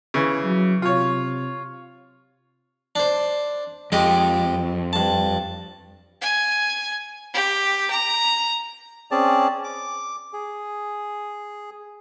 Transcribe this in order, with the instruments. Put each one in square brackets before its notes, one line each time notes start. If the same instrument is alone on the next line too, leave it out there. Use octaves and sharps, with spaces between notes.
[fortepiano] C#3 E3
[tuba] F#3
[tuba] C3 [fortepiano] F4 C#5
[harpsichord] D4 C5
[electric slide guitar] F2 [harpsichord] G#3 G4 D#5
[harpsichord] G2 A5
[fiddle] G#5
G4
A#5
[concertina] C4 C#4 G#4 D5 A5
D6
G#4